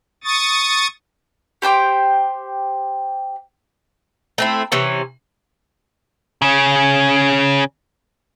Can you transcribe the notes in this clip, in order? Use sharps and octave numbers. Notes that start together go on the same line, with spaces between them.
C#6 D#6 A6
G4 C5 G5 D6
A3 C4 E4
C3 E3 C#4
C#3 C#4